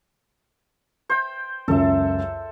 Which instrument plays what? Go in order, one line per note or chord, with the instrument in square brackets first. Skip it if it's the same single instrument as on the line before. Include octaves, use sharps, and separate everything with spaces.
[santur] C5 G5
[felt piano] C#2 F#2 [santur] A4 E5